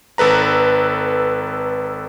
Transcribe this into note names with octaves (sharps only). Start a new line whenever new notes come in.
G#1 A4 B4 A#5